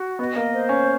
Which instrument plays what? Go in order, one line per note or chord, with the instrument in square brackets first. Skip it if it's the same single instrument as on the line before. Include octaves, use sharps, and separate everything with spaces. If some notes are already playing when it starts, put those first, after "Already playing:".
Already playing: [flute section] F#4
[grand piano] B3 [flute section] D#5
[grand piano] A#3
[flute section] C5
[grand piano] C#4